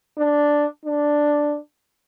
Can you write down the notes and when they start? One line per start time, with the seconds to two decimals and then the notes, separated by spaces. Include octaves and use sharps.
0.18 D4
0.86 D4